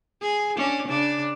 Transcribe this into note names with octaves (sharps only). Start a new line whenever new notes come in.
G#4
C#4 D4
C#3 D4